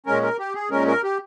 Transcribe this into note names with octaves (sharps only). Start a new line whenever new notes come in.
A#2 G#3 C#4 A#4
A#4
G4
G#4
A#2 G#3 C#4 A#4
A#4
G4